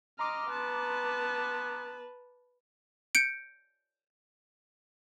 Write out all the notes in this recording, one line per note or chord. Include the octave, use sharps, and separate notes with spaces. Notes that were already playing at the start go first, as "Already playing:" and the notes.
D#5 A#5 C6 D6 F6
B3 B4 A5
G6 C#7 D7